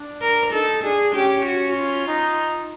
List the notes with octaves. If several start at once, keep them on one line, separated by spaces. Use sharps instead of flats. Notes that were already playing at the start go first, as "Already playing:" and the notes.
Already playing: D4
A#4
D#4 A4
D4 G#4
C#4 G4
F#4
F4
D#4